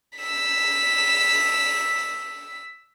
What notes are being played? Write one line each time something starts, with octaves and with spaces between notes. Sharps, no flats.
E6 B6